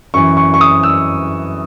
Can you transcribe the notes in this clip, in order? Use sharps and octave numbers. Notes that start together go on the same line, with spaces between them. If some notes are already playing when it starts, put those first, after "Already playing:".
F#2 E3 C#6
C#6
C#6
D#6
E6